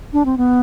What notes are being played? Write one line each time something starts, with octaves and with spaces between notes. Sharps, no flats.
D4
C4
B3